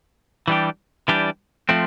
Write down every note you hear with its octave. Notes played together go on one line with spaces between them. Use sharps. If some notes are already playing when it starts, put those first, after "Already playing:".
E3 G3 D4 G4
E3 G3 D4 G4
F3 A3 C4